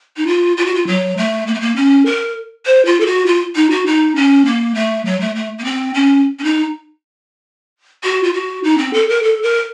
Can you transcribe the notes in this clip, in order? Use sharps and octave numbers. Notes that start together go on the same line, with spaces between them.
D#4
F4
F4
F#4
F4
F#3
A3
A#3
A3
A#3
C#4
A#4
C5
F4
A4
F#4
F4
D#4
F#4
D#4
C#4
A#3
A3
F#3
A3
A3
A#3
C4
C#4
C#4
D#4
F#4
F4
F#4
D#4
C4
A4
A#4
A4
A#4